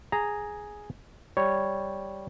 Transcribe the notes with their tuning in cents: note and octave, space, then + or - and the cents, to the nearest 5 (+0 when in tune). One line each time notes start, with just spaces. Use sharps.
G#4 +0 A#5 -5
G3 +0 C#5 +0